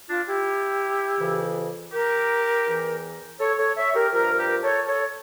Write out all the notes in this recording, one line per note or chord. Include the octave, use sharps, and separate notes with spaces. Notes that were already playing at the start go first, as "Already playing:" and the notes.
D4 F4
E4 G4
F2 C#3 E3
G4 A#4
E2 E3
A4 C#5
A4 C#5
C#5 E5
G4 A#4
G2 F3 G4 A#4
G4 A#4
A4 C#5
A4 C#5